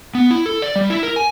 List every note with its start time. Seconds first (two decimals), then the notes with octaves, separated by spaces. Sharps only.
0.15 B3
0.31 E4
0.46 A4
0.62 D5
0.76 G3
0.90 E4
1.03 A#4
1.16 G#5